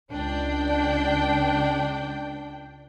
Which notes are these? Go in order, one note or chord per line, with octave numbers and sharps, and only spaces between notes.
C#2 D4 G5